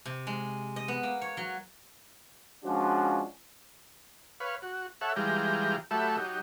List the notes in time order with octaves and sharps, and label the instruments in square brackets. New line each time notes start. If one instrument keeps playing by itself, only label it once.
[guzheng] C3
G#3
D#5
B3
A#3
C#5
F#3
[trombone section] F3 G#3 C#4 D4 F4 F#4
[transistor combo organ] B4 C#5 F5
F#4
A4 C#5 E5 F#5
E3 G3 G#3 F4 G5 A#5
F#3 A3 G4 A4 E5 B5
F#3 D#4 G4